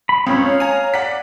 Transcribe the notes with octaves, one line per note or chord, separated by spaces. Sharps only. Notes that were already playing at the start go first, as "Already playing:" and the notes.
B5
C#2 C4 C#4
C#5 F5
G#5 A#5
D5 F#5 B6